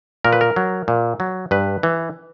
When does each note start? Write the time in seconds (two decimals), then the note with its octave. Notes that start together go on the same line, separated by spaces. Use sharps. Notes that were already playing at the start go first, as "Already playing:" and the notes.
0.24 A#2 A#4
0.33 B4
0.41 A#4
0.56 F#3
0.88 A#2
1.20 F#3
1.51 G2 B4
1.83 E3